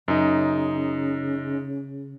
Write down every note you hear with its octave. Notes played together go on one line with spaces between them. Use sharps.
F#2 C#3 D#4